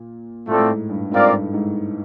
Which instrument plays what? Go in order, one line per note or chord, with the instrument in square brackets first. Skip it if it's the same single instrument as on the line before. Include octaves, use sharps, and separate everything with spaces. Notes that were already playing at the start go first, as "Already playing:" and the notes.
Already playing: [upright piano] A#2
[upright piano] A2 [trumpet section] A3 C4 F4 A4 D5
[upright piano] A2
G#2
G2
[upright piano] G#2 [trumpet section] C4 F4 A#4 D5 F5
[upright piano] G2
G#2